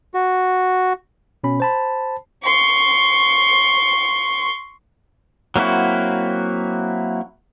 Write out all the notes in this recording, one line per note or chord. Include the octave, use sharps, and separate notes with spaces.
F#4
B2 C#4 B5
C5 A5 B5
C6 C#6
F#3 A#3 C4 E4 F#4